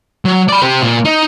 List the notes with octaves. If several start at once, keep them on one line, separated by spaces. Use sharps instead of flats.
F#3
D5 B5
G4 C5
A#2
D#4